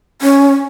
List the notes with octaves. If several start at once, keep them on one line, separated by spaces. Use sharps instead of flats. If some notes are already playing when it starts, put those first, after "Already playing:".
C#4